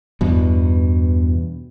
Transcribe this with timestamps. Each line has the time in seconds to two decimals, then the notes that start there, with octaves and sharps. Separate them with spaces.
0.21 E2 G2 B2